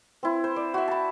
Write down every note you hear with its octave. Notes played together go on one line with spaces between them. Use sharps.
C4 E4
C5
D5
F#4 E5
A5 B5